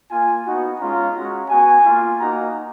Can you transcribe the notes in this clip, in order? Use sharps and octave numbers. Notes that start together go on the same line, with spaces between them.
A#3 F4 G#5
B3 D#4 F#4
G#3 C#4 F4 A#5
G#3 C#4 F#4
B3 F#4 G#5
A#3 F4
A#3 D#4 F#4 A#5